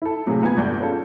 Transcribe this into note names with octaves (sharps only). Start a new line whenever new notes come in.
E4 A4
A2 C3 F#3 F4 G4 G#4
A#2 B3 B4 G#5 G#6
G1 E2 G2 D5 G6
C#4 F4 G#4 A4